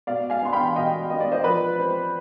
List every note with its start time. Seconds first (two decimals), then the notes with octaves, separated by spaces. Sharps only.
0.07 B2 D5 F5
0.30 F5 G#5
0.42 B3 D4 C6
0.53 G5 B5
0.76 B2 D#5 G5
1.10 B3 D4 D#5
1.20 D5
1.32 C5 D#5
1.44 F3 B4 D5
1.78 C4 C5